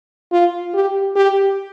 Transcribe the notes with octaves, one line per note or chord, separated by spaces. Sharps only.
F4
G4
G4